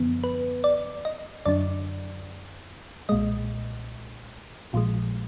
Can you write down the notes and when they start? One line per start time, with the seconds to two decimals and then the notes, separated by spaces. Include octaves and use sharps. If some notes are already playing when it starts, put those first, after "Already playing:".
Already playing: F#2 D3 F3 B3
0.24 B4
0.64 D5
1.05 D#5
1.46 F#2 D3 F#3 D4 D5
3.09 B1 A#2 G#3 D#5
4.73 A#1 A#2 F3 G#3